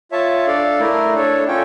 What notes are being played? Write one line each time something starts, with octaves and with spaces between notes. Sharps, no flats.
F4 C#5 E5 A5
D4 A4 D5 F5
A3 E4 A#4
D4 A4 C#5
C#4 F4 A4 C#5 G5